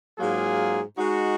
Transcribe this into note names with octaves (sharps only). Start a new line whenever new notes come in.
G#2 F#3 A#3 F4 G#4
G#3 D#4 F#4